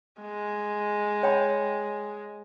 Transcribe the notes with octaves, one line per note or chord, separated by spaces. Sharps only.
G#3
C#5 G5 B5